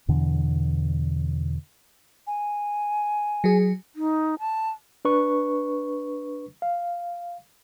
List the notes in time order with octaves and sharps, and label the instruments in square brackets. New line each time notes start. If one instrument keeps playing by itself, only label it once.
[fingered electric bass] E2 B2 D3 E3
[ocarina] G#5
[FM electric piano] F#3 G#4
[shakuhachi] D#4
A5
[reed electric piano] D4 B4 C#6
F5